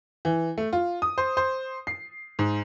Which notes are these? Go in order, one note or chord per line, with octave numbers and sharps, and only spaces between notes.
E3
A3
F4
D#6
C5
C5
C7
G#2